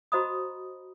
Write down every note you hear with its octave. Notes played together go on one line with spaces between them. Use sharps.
F#4 C5 D#5 A#5 B5 D#6